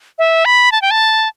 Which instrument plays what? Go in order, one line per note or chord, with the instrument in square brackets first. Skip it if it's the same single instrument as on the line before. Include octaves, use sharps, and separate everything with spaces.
[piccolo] E5
B5
A5
G5
A5